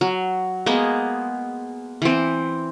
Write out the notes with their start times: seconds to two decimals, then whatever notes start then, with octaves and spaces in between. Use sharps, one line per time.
0.01 F#3
0.66 G#3 A#3 B3
2.02 E3 C4